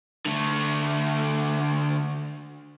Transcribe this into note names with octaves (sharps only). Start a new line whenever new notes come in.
D3 A3